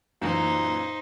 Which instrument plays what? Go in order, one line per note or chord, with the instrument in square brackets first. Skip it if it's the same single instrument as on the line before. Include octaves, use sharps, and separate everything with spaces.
[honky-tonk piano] F#2 A#2 E3 [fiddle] D#4 C5